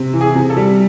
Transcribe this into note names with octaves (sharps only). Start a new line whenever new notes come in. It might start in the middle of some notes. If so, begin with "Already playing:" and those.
Already playing: C3
E3
G#4
C3
A4
G3